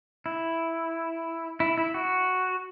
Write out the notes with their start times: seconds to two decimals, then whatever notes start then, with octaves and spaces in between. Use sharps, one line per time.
0.26 E4
1.60 E4
1.78 E4
1.94 F#4